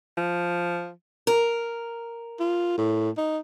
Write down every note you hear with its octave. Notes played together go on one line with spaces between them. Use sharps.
F3
A#4
F4
A2
D#4